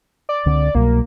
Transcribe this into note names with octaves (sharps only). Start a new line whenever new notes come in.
D5
C#2 D3 C4
C2 B2 F#3 A#3